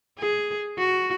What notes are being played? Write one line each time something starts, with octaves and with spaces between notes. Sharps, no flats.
G#4
F#4